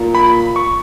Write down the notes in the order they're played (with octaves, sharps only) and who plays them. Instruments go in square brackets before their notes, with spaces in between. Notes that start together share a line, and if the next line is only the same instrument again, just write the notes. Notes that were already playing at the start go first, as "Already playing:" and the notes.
Already playing: [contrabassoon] A#2
[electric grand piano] B5
C#6